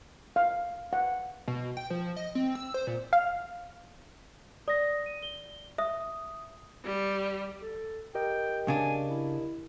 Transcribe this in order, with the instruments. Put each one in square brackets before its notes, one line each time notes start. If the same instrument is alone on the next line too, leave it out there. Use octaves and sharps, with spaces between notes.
[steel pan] F5
F#5
[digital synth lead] B2
G5
F3
D#5
C4
E6
C5
A#2
[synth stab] F5
[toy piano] D5 [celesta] D#6 A#6
[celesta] D#7
G7
[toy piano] E5 [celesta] D#6
[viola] G3
[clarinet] A4
[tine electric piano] G4 A#4 D#5 [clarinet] G5
[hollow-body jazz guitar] C#3 D4 [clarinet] G#5
[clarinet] E4